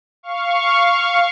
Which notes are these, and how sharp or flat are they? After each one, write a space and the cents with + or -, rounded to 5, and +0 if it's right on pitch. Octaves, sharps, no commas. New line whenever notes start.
F5 -5 C#6 +0